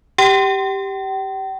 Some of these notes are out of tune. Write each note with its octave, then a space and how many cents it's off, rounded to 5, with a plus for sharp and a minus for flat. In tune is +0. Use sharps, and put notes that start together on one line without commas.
G4 +0 G5 -40